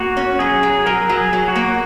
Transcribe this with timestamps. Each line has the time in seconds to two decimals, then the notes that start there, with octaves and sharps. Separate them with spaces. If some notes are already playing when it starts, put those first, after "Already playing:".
Already playing: A#3 F#4
0.17 C#4
0.39 F#3 G#4
0.63 F#3
0.86 F#3 A#4
1.09 F#3
1.17 G#4
1.33 F#3
1.48 F#4
1.56 A#3